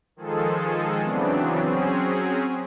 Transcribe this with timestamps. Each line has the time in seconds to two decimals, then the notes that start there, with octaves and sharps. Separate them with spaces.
0.16 D#3 F3 G#3 G#4 A4
1.01 C#3 E3 F#3 B3 C4 D4
1.61 F#3 C4 C#4 G#4